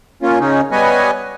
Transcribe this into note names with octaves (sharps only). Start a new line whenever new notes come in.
A#3 C#4 F4
C#3 C#4 D#4
G3 B3 B4 C#5 D#5 G#5